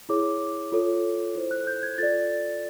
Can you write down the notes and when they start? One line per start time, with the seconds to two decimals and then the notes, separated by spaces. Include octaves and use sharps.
0.09 E4 G#4 C#5 D6
0.72 F4 A4 C#5
1.35 E4 A4 C5
1.51 F#6
1.67 G6
1.83 G#6
1.98 F4 A4 D5 A6